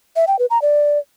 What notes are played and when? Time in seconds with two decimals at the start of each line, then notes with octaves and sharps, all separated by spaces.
0.16 E5
0.27 G5
0.39 B4
0.50 A#5
0.62 D5